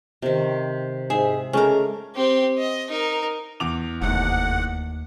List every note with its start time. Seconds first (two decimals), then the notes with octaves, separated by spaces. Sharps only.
0.22 C3 D#3
1.10 G#2 G#4 E5
1.53 C#3 G#3 A3 C#4 A#4 D6
2.16 C4 G4
2.58 D#5
2.89 D#4 A#4
3.60 E2 D6 F7
4.02 F1 D#2 A3 F#5